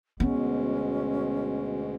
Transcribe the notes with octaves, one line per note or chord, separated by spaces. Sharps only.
D2 B2 G#3 B3 C#4